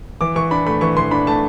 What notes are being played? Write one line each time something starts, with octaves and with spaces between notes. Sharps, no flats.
E3 D6
E3 C#6
D4 B5
A3 B5
E3 C#6
E3 C6
D4 B5
A3 A5